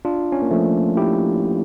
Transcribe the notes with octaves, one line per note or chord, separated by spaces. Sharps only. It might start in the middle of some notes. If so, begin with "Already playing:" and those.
D4 F4
C#4
A#3
F3 A3
E4 G4